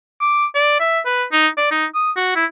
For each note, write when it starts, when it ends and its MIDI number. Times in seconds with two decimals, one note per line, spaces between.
0.21 0.45 86
0.55 0.78 74
0.80 1.00 76
1.06 1.24 71
1.32 1.48 63
1.57 1.68 74
1.71 1.86 63
1.95 2.11 87
2.16 2.33 66
2.36 2.45 64